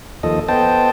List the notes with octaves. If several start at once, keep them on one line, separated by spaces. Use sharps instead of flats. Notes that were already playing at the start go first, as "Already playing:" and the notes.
D#2 F3 A4 D#5
B3 A4 C5 D#5 G5 A5